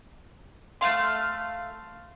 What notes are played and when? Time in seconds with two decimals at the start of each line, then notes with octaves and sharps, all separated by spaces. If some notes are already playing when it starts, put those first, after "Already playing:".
0.81 A3 A#3 F5 C6